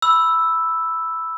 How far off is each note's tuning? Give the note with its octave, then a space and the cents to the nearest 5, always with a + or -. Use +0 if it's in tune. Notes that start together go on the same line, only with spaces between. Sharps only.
B5 +0 E6 +0